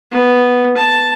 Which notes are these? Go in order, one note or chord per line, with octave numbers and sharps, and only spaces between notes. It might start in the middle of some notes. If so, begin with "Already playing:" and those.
B3
A5